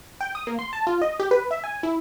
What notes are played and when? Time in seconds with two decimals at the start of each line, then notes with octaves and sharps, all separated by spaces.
0.21 G5
0.35 D#6
0.47 A#3
0.59 C6
0.73 A5
0.87 F4
1.02 D#5
1.20 G4
1.31 B4
1.51 E5
1.64 G#5
1.83 E4